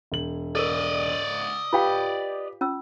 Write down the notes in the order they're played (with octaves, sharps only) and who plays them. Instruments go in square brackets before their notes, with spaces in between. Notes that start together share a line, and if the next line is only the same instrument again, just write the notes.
[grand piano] E1 F#7
[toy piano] A4 A#4 [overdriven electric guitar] D5 D#5
[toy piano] F4 F5 G5 [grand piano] G4 B4
[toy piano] C#4 F4 E6